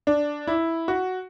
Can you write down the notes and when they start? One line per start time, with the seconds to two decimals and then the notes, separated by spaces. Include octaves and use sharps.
0.07 D4
0.47 E4
0.88 F#4